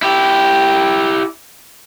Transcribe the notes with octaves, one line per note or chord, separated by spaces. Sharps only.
E4 G4